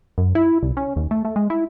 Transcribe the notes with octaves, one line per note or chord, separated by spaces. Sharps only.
F#2
E4
C2
C#4
D#2
A3
A3
G#3
E4